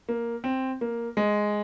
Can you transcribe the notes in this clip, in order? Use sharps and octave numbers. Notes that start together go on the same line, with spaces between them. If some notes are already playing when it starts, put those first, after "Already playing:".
A#3
C4
A#3
G#3